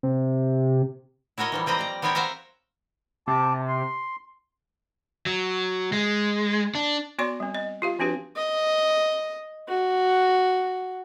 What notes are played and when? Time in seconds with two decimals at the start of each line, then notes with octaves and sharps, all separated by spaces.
0.03 C3
1.38 E4 F#4 A#4 C#5 D#5
1.52 E3 F3 G3
1.66 A#3 C4 B4 D#5 A#5
1.79 D5 A#5
2.02 B3 C4 A#4 B4 C#5 G5
2.15 F#4 C5 E5 F5 A#5
3.27 C3 A5 D6
3.68 C6
5.26 F#3
5.93 G#3
6.75 D4
7.19 B3 F#4 C#5 D5 C6 C#6
7.40 G3 C4
7.55 D#5
7.82 F4 G4 F5
7.99 F3 C4 D4 F#4 G4 B4
8.36 D#5
9.68 F#4